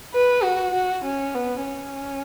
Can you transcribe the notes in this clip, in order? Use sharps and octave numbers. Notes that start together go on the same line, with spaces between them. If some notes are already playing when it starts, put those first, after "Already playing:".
B4
F#4
F#4
C#4
B3
C#4